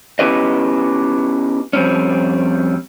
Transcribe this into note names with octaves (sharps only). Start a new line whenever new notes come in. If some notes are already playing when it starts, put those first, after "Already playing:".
B3 C#4 E4 G4 B4 D#5
F2 G3 C4 C#4